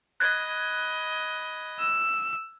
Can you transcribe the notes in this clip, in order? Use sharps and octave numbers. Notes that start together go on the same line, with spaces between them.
D#5 B5 F#6 G#6
E6